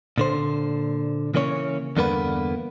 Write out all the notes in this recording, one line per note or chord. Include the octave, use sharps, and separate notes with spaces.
A#2 D3 C5
C#3 E3 A#3 C#4 C5 C#5
E2 G2 D3 A#3 B3 B4